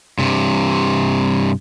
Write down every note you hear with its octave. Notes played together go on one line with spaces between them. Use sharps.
G2 C3